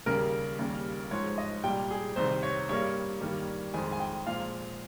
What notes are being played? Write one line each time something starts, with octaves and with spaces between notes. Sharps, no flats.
D#2 C#3 G3 A#3 A#4
D#2 C#3 G3 A#3
G#2 F3 G#3 C#5
D#5
C2 A#2 G3 G5
G#4
C2 C3 D#3 C5
C#5
G2 G3 A#3 C#5
G2 D#3 G3 A#3
F2 D#3 G#3 G#5
G#5
G5
A#2 F3 G#3 F5